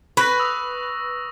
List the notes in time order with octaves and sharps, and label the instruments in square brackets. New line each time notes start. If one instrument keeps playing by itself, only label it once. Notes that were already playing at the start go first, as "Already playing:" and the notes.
[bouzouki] B4 [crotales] C#6 A#6
[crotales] D#6 E6